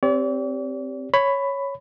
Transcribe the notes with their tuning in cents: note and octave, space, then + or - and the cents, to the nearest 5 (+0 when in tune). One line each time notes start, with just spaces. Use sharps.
C4 +0 G4 +5 D5 -45
C#5 +0 B5 +10